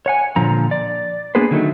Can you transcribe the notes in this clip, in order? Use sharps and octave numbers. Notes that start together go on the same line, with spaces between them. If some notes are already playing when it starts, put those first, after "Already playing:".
C#5 F#5 G#5
A#2 D3 F3 A#5
D5
A#3 B3 D4 G#4 B4 C5
D3 D#3 F#3 A3 D#4